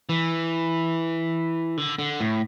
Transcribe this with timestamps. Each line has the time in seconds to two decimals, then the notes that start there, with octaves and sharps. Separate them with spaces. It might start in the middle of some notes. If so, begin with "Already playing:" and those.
0.09 E3
1.77 D3
1.99 D3
2.21 A2